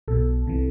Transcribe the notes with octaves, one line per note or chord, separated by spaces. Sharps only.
B1 B2 A4
C2 C3 E3